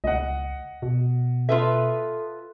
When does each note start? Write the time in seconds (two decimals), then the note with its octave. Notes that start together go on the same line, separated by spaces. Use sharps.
0.04 C#2 D#5 F#5
0.82 B2
1.49 F4 A4 B4 E5